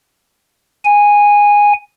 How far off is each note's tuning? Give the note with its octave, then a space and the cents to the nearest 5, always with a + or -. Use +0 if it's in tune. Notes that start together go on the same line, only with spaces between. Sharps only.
G#5 -10